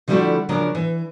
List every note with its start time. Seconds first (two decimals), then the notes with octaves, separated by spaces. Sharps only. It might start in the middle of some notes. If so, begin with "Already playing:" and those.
0.08 D3 F3 G3 A3 E4 F#4
0.49 C#3 F3 F#3 D4 A#4
0.75 E3